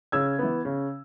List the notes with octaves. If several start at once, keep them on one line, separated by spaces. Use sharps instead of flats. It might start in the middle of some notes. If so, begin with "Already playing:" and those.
C#3 E6 G#6
E3 B3
C#3